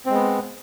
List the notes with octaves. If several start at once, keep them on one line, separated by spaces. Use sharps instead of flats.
G#3 B3 C4